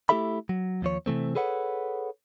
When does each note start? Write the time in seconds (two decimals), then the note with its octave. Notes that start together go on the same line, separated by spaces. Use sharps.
0.09 A3 E4 G4 A4 E5 B5
0.49 F#3
0.82 D#2 F3 C#5
1.06 C3 E3 A3 C4
1.35 G#4 A4 B4 C#5 F#5